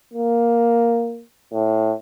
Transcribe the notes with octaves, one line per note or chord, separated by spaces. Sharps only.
A#3
A2